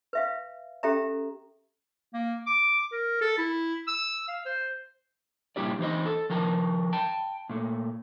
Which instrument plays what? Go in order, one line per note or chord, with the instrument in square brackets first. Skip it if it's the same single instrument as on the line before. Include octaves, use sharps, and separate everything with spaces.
[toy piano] B4 E5 F5
C#4 G4 A4 E5 A#5
[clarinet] A#3
D6
A#4
A4
E4
E6
F5
C5
[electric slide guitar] A#2 G3 E4 G4 D5
E3 D#4 C5 D#5
A4
D#3 F3 A#4 A5
G5 A5
A#2 A3